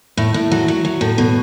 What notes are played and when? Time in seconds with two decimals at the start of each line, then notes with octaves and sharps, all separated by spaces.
0.17 A2
0.34 A2
0.51 F#3
0.68 F#3
0.85 F#3
1.01 A2
1.18 B2